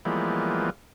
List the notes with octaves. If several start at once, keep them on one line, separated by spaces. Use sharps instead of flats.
E3 F3 G3 G#3 A#3 B3